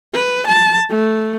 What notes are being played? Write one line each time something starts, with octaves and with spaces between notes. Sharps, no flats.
B4
A5
A3